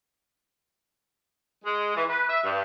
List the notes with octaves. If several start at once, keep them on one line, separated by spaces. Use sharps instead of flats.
G#3
E3
B4
E5
G2